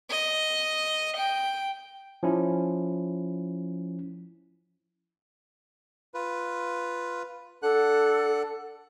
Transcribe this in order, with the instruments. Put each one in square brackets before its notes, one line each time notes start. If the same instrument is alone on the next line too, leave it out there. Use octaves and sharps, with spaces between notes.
[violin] D#5
G5
[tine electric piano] F3 C#4 E4
[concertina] F4 B4
[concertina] D4 F#5 F#6 [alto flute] A4